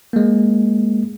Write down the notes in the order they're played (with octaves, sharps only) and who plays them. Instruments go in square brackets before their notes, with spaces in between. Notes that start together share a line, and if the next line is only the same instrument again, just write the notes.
[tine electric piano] G#3 A#3